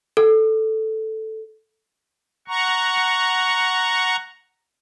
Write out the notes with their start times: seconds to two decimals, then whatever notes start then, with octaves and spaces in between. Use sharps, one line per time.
0.17 A4
2.48 F#5 A#5 C#6